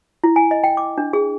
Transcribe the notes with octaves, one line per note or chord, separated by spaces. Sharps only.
E4
G#5
D#5
G5
D6
D4
G#4